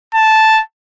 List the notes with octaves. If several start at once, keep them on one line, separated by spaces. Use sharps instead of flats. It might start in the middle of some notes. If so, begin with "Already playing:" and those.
A5